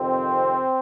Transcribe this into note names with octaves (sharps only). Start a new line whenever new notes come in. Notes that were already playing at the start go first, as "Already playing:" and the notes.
Already playing: F2 C3 D#3 C4